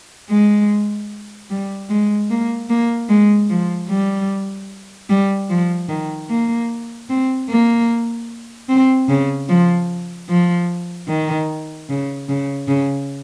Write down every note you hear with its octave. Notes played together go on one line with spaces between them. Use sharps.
G#3
G3
G#3
A#3
A#3
G#3
F3
G3
G3
F3
D#3
A#3
C4
A#3
C4
C#3
F3
F3
D#3
C#3
C#3
C#3